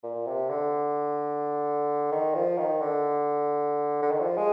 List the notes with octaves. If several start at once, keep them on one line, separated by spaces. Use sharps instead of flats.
A#2
C3
D3
D#3
F3
D#3
D3
D3
D#3
F3
G#3